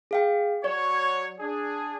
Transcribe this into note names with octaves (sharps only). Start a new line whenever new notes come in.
G#4 F5 G5
F#3 F#4 C#5 D5
D4 G#4